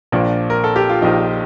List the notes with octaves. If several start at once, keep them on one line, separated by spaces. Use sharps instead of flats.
A#1 A#2 F3 D4
A#4
A4
G4
F4
A#1 A#2 F3 D#4